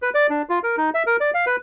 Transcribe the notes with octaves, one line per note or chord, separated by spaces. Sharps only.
B4
D5
D4
F4
A#4
D#4
E5
A#4
D5
F5
B4